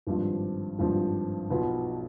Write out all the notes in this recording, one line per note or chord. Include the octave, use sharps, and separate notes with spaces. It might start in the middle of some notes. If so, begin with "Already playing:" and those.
G#1 G2 F3
G#1 G2 F3
B1 B2 B3 F4 B4